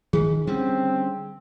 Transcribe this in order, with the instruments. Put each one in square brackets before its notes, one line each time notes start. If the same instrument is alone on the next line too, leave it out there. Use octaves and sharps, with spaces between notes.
[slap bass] D#3 [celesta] G#4
[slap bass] D3 G3 C#4 [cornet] C4